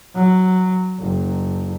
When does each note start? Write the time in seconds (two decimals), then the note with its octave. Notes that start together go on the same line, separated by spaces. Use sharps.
0.15 F#3
1.00 F#1